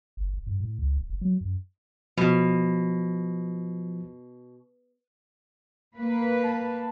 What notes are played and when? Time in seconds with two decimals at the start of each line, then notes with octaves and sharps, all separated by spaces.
0.17 F#1
0.33 E1
0.47 G2
0.60 A2
0.79 C#2
0.97 D1
1.10 F1
1.21 F#3
1.41 F#2
2.18 B2 F3
5.96 A#3 B4
6.44 A5